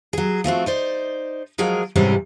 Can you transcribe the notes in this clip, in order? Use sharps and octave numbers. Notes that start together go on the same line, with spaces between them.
F#3 G#4
F3 A3 C4 F#4
D#4 C5 D5
F3 F#3 G#3 G#4 A#4
G#2 C3 E3 G3 C4 C#4